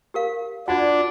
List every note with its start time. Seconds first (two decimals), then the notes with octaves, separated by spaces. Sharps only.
0.14 G4 A#4 F5
0.68 D4 F4 F#4 D5 F#5